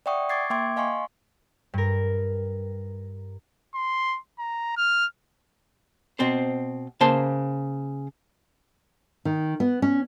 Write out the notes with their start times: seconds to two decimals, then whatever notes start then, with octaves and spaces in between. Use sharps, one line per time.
0.06 D5 E5 F#5 G5 C#6 D#6
0.29 C#6 D6 G#6 A6 C7
0.50 A#3 E5 G5 C6 D6 G#6
0.76 D#5 F5 G#5 C6 C#6
1.74 G2 A#4
3.75 C6
4.39 A#5
4.77 F6
6.19 B2 C4 C5
7.01 C#3 A#3 C5 A5
9.25 D#3
9.60 B3
9.82 C#4